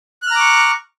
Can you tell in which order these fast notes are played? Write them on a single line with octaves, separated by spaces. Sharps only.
F#6 F6 A#5 D6 C#6